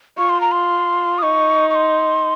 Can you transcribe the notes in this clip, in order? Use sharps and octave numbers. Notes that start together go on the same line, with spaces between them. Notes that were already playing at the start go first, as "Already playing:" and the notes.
F4 C#6
C6
A#5
C6
D#6
D#4 C#6
C#6
C6